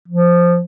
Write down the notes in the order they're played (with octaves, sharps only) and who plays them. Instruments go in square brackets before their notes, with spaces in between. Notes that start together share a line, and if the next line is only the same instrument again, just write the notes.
[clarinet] F3